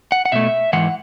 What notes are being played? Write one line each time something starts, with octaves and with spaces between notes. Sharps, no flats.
F#5
F#5
B2 A3 E5
G#2 E3 F#5